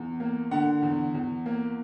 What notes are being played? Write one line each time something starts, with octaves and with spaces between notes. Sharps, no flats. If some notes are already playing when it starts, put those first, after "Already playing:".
Already playing: E2
A#3
D3 F#5
E2
E2
A#3